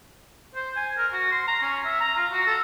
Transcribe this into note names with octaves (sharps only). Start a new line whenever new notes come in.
C5
G#5
A#4
F#4
C6
A#5
C#4
E5
A#5
F4
F#4
A4